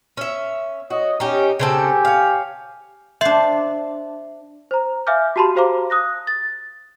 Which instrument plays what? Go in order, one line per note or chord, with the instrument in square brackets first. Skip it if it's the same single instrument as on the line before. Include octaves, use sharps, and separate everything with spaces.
[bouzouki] C#4 E5
[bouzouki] F#4 [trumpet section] C#5 D#5
[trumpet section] C#4 [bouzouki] D#4 G4
[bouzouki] C#3 C4 A4 [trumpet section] G4 G#5
[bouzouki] C#5 F5
[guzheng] D4 C5 [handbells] E5
[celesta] C5 A#5
E5 F5 G#5 D6 F6 G6
F#4 G4 A5 B5 C6
F#4 G4 C5 F5 A#5 D6
D#6 F#6 A#6
A6